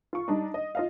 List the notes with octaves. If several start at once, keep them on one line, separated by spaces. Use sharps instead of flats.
F4 C#6
G3 D4 D#4
D#5
F4 D#5 F5